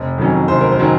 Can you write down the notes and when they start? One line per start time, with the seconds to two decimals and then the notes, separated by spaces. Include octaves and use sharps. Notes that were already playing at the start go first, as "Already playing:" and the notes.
Already playing: F1
0.18 F2 D#3 F#3 C#4
0.48 F1 C5
0.61 A#4
0.72 C5
0.79 D#3 F#3 C#4